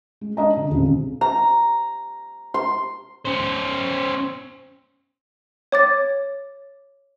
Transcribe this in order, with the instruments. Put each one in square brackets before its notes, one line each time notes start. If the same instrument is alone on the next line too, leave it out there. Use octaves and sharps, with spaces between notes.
[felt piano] G#3
D4 D#5 A#5
D3
D#1 C#2 C3
[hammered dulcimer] A#5
C6
[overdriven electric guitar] C#4 C5
[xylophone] C#5 D6 A6